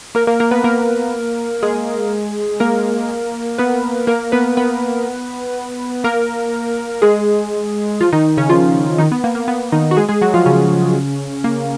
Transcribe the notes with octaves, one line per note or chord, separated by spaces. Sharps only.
A#3 A#4
A#3 A#4
A#3 A#4
B3 B4
A#3 A#4
G#3 G#4
A#3 A#4
B3 B4
A#3 A#4
B3 B4
B3 B4
A#3 A#4
G#3 G#4
F3 F4
D#3 D#4
C#3 C#4
F3 F4
D#3 D#4
B3
A#3
A#3
B3
D#3 D#4
F#4
G#3 G#4
G#3 G#4
F#3 F#4
F3 F4
C#3 C#4
A#3